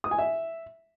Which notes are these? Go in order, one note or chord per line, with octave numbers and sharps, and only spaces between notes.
D#6
G#5
E5